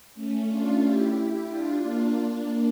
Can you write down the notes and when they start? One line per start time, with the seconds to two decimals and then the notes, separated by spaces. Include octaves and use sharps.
0.14 A3 C#4
0.47 D4 F4
0.80 E4 G4
1.47 D4 F4
1.81 A#3 D4
2.14 A#3 D4